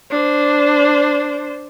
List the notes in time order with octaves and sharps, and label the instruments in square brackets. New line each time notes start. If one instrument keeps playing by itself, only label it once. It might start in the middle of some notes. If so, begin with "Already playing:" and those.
[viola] D4 C5